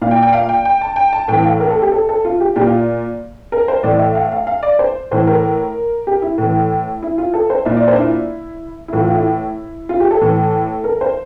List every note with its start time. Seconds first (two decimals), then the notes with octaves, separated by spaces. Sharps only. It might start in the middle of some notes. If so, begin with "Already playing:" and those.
0.01 A#2 F5
0.11 G5
0.22 G5
0.33 F5
0.49 G5
0.65 G5
0.81 A5
0.96 G5
1.13 A5
1.28 A2 E3 G5
1.44 F5
1.60 A#4
1.70 A4
1.82 G4
1.92 A4
2.09 A4
2.25 F4
2.40 G4
2.56 A#2 G4
2.66 F4
3.52 A#4
3.68 C5
3.83 A2 E3 D5
3.99 E5
4.15 F5
4.32 F5
4.47 F5
4.63 D5
4.79 C5
5.11 A2 E3 C5
5.27 A#4
6.07 G4
6.22 E4
6.38 A2 E3
7.03 E4
7.18 F4
7.34 A4
7.50 C5
7.65 A#2 E5
7.77 D5
7.88 D4 C5
7.98 E4
8.88 E4
8.93 A2 E3 F4
9.04 F4
9.15 E4
9.89 F4
10.00 G4
10.11 A4
10.21 A2 E3
10.84 A#4
11.01 C5